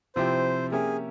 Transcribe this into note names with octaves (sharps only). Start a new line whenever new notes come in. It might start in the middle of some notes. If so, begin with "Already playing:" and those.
C3 F3 C4 E4 G4 C5
A#3 C#4 G4 G#4 A#4 E5